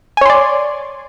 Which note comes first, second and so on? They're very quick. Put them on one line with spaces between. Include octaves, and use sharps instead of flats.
G#5 C#5 C6 D5